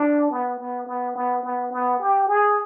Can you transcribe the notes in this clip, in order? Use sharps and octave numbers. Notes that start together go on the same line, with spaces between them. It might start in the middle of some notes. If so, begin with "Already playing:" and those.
Already playing: D4
B3
B3
B3
B3
B3
B3
G4
G#4